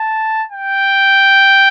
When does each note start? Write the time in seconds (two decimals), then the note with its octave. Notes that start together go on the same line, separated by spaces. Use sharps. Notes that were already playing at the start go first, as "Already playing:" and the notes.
Already playing: A5
0.52 G5